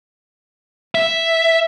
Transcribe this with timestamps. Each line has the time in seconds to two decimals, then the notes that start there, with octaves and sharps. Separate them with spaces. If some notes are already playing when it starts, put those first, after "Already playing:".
0.95 E5